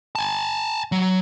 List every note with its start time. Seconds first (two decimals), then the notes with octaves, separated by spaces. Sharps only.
0.15 G#5 A5
0.92 F#3